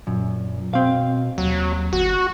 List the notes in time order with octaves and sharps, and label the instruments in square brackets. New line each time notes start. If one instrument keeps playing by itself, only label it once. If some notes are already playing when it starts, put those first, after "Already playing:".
[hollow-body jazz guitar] F#2 [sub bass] A#2
[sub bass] B2 [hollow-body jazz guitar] C4 F5
[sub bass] D#2 [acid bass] F#3
[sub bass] G1 [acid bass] F#4